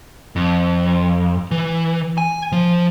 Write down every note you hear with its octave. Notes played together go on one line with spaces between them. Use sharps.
F2
E3
G#5
F3